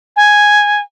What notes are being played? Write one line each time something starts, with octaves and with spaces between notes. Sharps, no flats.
G#5